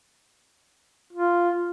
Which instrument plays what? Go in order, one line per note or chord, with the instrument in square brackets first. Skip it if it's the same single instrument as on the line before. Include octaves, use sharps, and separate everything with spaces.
[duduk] F4